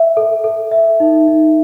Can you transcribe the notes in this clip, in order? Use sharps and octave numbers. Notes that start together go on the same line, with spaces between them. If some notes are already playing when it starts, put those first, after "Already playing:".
Already playing: E5
A4
A4
E5
D#4
D#4